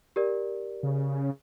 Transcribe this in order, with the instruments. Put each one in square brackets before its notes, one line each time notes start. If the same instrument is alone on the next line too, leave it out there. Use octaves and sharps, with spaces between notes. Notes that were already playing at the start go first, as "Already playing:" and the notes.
[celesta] G4 A#4 D5
[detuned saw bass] C#3